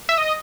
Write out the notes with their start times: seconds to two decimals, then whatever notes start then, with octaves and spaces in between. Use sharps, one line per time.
0.09 E5
0.18 D#5